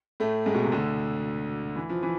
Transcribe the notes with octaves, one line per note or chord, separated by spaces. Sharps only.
A2 A3
G#2 G#3
B2
C3
D2 D3
E3
F3
E3